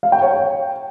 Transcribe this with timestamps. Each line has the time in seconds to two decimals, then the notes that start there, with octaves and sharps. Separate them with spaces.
0.03 F5
0.12 G5
0.22 C#5
0.31 G5